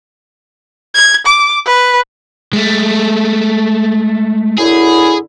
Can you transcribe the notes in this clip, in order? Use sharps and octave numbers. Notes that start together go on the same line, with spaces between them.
G#6
D6
B4
G#3 A3
F#2 D3 E4 G#4